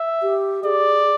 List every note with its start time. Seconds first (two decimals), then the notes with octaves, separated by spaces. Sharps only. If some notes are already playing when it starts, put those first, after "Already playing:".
Already playing: E5
0.22 G4
0.64 G#4 D5